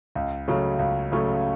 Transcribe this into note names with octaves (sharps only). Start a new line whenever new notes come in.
C#2
C#3 F#3 A3 C#4
C#2
C#3 F#3 A3 C#4